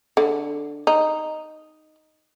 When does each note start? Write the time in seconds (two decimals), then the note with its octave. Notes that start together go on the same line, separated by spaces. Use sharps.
0.17 D3
0.87 D#4